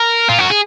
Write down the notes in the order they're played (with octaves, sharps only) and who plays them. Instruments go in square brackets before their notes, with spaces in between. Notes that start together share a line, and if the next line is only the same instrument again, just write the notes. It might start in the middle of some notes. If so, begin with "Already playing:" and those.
Already playing: [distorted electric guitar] A#4
F4
F#4
G#4